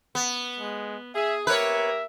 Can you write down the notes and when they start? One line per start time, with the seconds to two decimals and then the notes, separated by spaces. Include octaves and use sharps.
0.15 B3
0.59 G#3
1.15 G#4 E5
1.47 A#3 G4 A#4 B4 C#5 E5